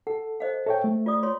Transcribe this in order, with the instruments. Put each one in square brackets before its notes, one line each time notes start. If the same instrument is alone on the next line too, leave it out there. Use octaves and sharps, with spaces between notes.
[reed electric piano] A4 [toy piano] F#5
[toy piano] C5 D#5 F5
[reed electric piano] A4 C#5 G5 [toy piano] E5
[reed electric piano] A3
[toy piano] F4 D5 D#6
F4 C#5 C6